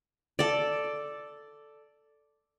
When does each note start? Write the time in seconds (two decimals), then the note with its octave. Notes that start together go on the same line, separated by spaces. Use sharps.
0.39 A4 D5